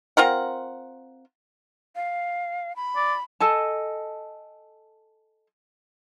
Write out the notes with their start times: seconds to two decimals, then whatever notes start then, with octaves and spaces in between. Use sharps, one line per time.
0.17 C4 F4 A#4 F#5
1.96 F5
2.76 B5
2.96 D5
3.40 A4 D#5 G#5 A5